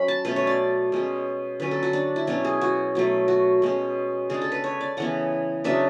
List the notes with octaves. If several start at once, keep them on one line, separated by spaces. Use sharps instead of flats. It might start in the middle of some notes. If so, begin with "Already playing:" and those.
Already playing: F#3 C#4 B5
A5
B2 A3 C#4 B4
C#5
D5
B2 G#3 C#4
D3 F#3 C#4 B4
A4
F#4
D4
E4
B2 F#3 C#4 D4
G#4
F#4
B2 F#3 A3
F#4
B2 G#3 C#4
C#3 G#3 D4 G#4
A4
B4
C#5
D5
C#3 E3 B3 F#5
C#3 F#3 B3 D4 E5